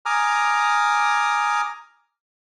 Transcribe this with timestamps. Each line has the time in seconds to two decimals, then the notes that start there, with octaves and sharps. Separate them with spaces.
0.06 G#5 A#5 D6 D#6 F6